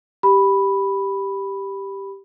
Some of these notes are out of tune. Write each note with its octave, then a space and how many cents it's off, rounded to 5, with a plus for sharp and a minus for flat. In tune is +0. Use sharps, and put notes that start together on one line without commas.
G4 +0 B5 +0